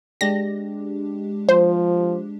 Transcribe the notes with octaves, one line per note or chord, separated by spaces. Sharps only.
G#3 D4 G4 A#6
F3 C5